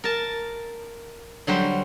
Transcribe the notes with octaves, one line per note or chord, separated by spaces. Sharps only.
A#4 A5
D3 F#3 G3 C5